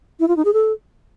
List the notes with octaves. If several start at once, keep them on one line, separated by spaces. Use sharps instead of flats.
E4
F4
D#4
G#4
A4